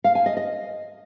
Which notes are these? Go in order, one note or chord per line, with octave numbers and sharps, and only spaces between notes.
F5
G#5
D#5
D#5